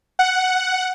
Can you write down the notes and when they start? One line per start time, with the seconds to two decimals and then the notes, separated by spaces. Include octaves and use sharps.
0.19 F#5